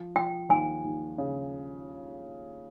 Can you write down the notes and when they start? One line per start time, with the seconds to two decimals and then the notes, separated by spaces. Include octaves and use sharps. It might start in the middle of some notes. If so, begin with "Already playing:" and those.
Already playing: F3
0.16 F3 G5
0.49 D#2 G#5
0.84 D#2
1.18 C#3